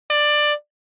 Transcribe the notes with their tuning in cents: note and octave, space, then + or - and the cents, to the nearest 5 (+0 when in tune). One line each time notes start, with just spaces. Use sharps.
D5 +15